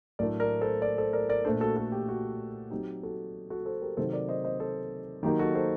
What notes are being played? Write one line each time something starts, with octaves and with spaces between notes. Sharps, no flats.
A2 F#3 A3 D4 A#4 D5
A#4 D5
A4 C5
A#4 D5
A4 C5
A#4 D5
A#4 D5
A#2 A3 D4 A4 C5
F#4 A4
F#4 A4
G4
F#4
F#3 C4 D#4 G4
F#4 A4
F#4 A4
A4 C5
G4 A#4
C3 D#3 F#3 C4 D#4 A4 C5
A#4 D5
C5 D#5
C5 D#5
A4 C5
D#3 F#3 A#3 D#4 G4
F#4 A4
A4 C5